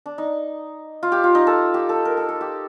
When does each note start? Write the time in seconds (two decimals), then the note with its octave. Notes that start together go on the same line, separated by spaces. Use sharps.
0.06 D4
0.18 D#4
1.03 F4
1.12 G4
1.24 F4
1.35 D#4
1.47 A4
1.74 G4
1.89 A4
2.05 A#4
2.17 A4
2.29 A4
2.41 G4